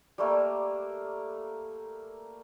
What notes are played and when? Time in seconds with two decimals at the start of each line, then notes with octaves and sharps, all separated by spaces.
0.18 G3 A3 A#3